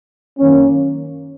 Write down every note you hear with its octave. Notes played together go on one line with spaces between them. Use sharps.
F#2 D#3 A#3 C#4